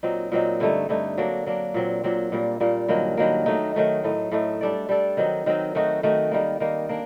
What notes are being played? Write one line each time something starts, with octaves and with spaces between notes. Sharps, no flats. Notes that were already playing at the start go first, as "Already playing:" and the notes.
A#2 F#3 C4 D#4
A#2 F#3 C4 D#4
G2 D3 A3 D#4
G2 D3 A3 D#4
F#3 A#3 D4
F#3 A#3 D4
A#2 F#3 C4
A#2 F#3 C4
A#2 G3 A#3
A#2 G3 A#3
G2 D#3 F#3 A#3
G2 D#3 F#3 A#3
D#3 F#3 A3 D#4
D#3 F#3 A3 D#4
A2 A3 D#4
A2 A3 D#4
G3 D4 A4 D5
G3 D4 A4 D5
D#3 F#3 C4 D#4
D#3 F#3 C4 D#4
D#3 A3 D#4 F#4
D#3 A3 D#4 F#4
D#3 G3 A#3
D#3 G3 A#3
A#3 D4